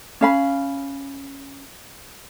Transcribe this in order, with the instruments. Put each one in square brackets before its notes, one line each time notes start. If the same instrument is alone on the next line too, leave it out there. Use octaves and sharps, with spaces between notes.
[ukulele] C#4 F5 B5